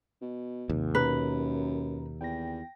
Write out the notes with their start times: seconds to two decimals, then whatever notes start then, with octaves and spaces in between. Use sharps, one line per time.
0.21 B2
0.70 D#2 G#2 C3
0.95 F#2 B2 B4 A#5
2.21 E2 G5 A#6